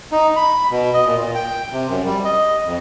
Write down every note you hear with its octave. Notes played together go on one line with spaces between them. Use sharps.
D#4
B5
B2
D#5
A#2
A#2
G5
C3
F#2
G3
D#5
F2